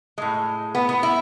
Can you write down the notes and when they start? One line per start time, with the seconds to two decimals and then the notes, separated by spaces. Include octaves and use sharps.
0.18 A2 G#3
0.75 B3
0.89 B3
1.03 E4